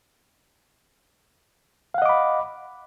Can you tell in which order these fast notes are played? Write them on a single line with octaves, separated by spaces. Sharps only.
F5 F#5 D#5 D6 B5